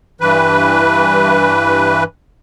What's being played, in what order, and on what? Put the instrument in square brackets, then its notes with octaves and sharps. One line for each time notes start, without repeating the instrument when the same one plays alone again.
[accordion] G2 E3 B4